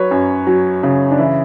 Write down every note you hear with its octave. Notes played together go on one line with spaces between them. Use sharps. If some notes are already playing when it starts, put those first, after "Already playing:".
Already playing: F#3 B4 C#5
F#2
F#3
C#3
D4
E3 E4